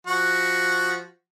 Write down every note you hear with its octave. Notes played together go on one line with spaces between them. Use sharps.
F3 F#4